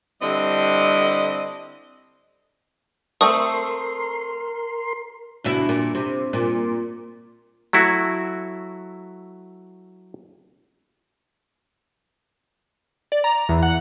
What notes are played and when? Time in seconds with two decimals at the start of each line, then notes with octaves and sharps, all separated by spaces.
0.22 D3 G3 C4 E4 D5 D#5
3.21 A3 C4 A4 A#4 C6 C#6 D#6
5.44 D2 B2 E4
5.69 A#2
5.95 C3
6.33 A#2
7.73 F#3 A3 E4 F#4
13.12 D5
13.24 A#5
13.49 E2
13.63 F#5